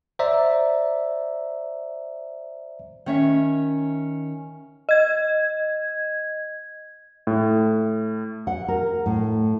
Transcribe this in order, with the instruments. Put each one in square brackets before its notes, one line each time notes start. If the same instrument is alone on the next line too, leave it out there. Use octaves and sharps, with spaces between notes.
[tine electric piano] C5 D5 E5 A#5
[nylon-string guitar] D#3 C#4 E5
[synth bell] D#5 G#6
[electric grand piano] A2
[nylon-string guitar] F#5
A#4
A2